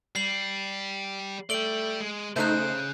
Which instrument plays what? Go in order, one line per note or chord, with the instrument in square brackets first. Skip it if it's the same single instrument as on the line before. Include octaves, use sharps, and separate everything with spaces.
[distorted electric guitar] G3 [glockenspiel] C7 F#7
[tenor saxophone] A3 [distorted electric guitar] D5 G5 [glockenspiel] D7 F#7 G7
[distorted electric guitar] G#3
[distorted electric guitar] C#3 [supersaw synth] A3 D#4 [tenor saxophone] C5 [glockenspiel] F#6 G6